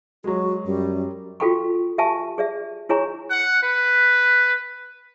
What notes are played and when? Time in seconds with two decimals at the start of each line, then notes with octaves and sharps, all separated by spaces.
0.24 F#3 G#3 F#4
0.66 F#2 G3
1.40 F4 F#4 A4 G5 B5 C#6
1.98 G4 E5 G#5 A5 C#6
2.38 G#4 D5 E5
2.89 E4 G#4 C#5 G#5 A#5 C#6
3.31 F#5
3.63 B4